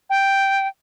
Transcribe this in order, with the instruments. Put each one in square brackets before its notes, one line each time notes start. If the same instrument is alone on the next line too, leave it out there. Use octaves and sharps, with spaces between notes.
[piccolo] G5